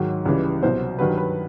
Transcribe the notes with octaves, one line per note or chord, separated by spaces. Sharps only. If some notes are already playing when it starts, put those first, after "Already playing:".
Already playing: G#2 D#3 F#3
C#2 C#3 E3 G3
C2 B2 F#3 C5
G2 D#3 F#3 B4
B4